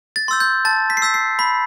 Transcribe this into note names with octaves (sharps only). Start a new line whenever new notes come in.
A6
C6 E6 G6
G6
A5 A6
B6
C7
E6 G6 B6
C7
B5 B6